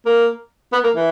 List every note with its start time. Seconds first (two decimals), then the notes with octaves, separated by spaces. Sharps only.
0.06 A#3
0.72 B3
0.84 A#3
0.96 E3